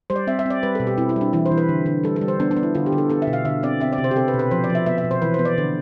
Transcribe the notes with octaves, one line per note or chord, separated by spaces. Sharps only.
G3 C5
D5
C4 E5
E5
C4 D5
G3 B4
B2 A4
G4
C4 E4
E4
G3 D4
E3 E4
C5
E3
B4
D3
D3
G3 A4
A4
G3
C5
B3 D4
D4
B3
E4
D3 F4
G4
D3
A4
B3 A4
E5
B2
F5
D3 E5
C4 D5
C4 E5
D5
C3
C5
G4
C4 A4
B4
B2
B4
F3 C5
D5
F3
E5
B3 E5
E5
B2
C5
E3 B4
C5
B3
D5
D3